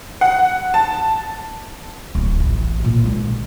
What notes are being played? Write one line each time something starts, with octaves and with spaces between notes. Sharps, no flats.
F#5
A5
D1
A1
A#2
D#3 G#3